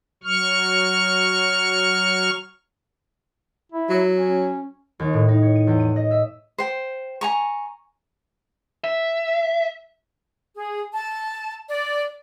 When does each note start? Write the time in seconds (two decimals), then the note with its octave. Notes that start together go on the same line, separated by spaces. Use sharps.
0.24 F#3 C#6 F6
3.72 E4
3.90 F#3
4.16 C#4
4.99 D#2
5.13 A2
5.28 D#4
5.42 C#5
5.56 D#7
5.67 E2
5.80 D#7
5.96 D#5
6.11 E5
6.58 C5 G5
7.21 G#5 A#5 C#6
8.84 E5
10.56 G#4
10.92 A5
11.69 D5